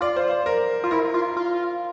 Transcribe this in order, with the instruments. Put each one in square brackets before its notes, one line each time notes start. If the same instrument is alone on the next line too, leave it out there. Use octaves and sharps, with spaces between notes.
[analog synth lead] F4 [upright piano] D5
[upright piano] C5
C5
A#4
[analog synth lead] F4
[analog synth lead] E4 [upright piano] A#4
[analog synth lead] F4
F4